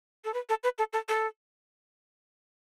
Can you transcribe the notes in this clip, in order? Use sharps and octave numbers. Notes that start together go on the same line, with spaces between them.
A4
B4
A4
B4
A4
A4
A4